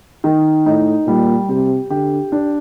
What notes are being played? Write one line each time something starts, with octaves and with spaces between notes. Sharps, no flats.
D#3
A2 D#4
A#2 G3
C3 G4
D3 G4
D4